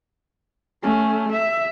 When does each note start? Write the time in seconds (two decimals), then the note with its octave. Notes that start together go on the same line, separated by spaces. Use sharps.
0.83 A3 C#4
1.32 E5